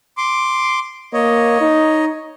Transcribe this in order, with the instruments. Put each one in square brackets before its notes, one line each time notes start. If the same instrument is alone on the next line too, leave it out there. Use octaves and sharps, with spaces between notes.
[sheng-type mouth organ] C6 D6
[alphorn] A#3 [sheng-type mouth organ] C#5 D#5
[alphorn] D#4